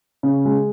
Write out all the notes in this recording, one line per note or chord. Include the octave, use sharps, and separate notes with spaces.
C#3
G#3